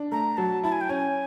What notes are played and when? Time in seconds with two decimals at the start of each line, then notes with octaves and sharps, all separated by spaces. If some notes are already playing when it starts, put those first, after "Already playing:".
Already playing: D4
0.12 A3 A#5
0.37 F#3 A5
0.63 E4 A5
0.72 G#5
0.81 G5
0.89 C#4 G#5